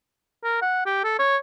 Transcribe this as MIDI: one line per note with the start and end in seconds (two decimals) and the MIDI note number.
0.43 0.61 70
0.62 0.82 78
0.86 1.01 67
1.04 1.18 69
1.19 1.37 73